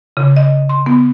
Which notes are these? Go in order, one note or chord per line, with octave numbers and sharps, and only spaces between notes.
C#3
D#5
C6
B3